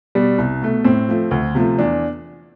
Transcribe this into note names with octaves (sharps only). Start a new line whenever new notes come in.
B2 G3
C2
B2 A3
A2 C4
F3 A3
D2
C3 F3 A3
E2 D4